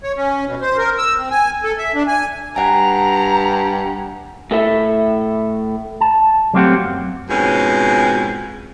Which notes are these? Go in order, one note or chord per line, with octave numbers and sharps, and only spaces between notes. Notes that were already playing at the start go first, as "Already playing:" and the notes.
C#5
C#4
B2
C5
A#4
E6
C4
G#5
A4
E5
D4
G#5
G2 F#5 G#5 A#5
A2 A4 E5
A5
F#3 A3 A#3 C4 G4 F#5
F#2
F2 G#2 B2 C#4